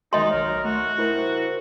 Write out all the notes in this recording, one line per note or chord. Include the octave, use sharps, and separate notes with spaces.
D#3 G#3 D#4 F#4 D#5 C6
B1 A#4 C#5
A3 F#4
E4 A#4 C5